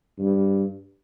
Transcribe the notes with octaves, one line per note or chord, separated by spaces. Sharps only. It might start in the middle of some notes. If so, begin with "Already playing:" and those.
G2